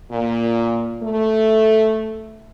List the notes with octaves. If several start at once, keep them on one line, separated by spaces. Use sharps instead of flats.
A#2
A3